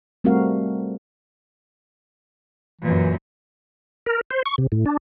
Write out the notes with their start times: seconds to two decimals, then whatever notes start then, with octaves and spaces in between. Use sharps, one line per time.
0.24 G3 A3 C4 F#4 A#4 F5
2.81 F#2 A#2 E3
4.06 A#4
4.31 C5
4.46 C#6
4.58 C3
4.72 A2
4.86 D4